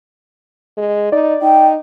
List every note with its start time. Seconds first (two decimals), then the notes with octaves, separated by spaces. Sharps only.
0.78 G#3
1.12 D#4 D5
1.42 D#4 G5